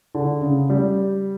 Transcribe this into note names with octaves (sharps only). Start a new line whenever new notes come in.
D3
C#3
G3